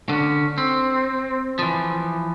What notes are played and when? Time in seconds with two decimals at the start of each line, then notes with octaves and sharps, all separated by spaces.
0.09 D3 C#4
0.58 C4
1.59 E3 F3